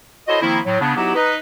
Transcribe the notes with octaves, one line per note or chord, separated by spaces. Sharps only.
E4 F#4 A4 C5 C#5 D#5
D#3 F3 A#3 C4 E4
A2 F#3
C#3 B3 D4
F#3 B3 D#4 E4 F#4 G4
D#4 B4